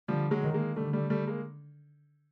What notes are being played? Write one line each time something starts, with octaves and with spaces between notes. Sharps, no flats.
D3 F3 G3
F#3 G#3
D#3
G#3 A#3
D3 G3 A3
G3 A3
G3 A3
G#3 A#3